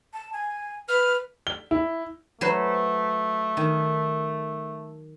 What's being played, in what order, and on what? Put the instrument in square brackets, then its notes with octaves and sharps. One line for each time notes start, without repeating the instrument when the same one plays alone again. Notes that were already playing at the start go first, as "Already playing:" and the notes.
[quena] A5
G#5
[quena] B4 [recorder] F6
[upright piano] G7
E4
[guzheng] F#3 B4 C5 [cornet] A3
[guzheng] D#3